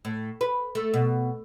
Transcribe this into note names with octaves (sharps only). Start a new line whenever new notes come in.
A2
B4
A3
B2